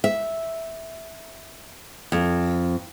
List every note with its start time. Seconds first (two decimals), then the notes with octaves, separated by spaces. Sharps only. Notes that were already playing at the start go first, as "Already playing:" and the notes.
0.04 E5
2.12 F2